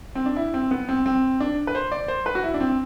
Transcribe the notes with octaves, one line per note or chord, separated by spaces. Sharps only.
C4
D4
E4
C4
B3
C4
C4
D4
B4
C5
D5
C5
B4
F#4
E4
D4
C4